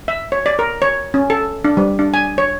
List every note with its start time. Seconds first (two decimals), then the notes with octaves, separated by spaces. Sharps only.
0.08 E5
0.32 C#5
0.46 D5
0.59 A#4
0.82 C#5
1.14 C#4
1.30 A4
1.64 D4
1.77 G3
1.99 D4
2.14 G#5
2.38 C#5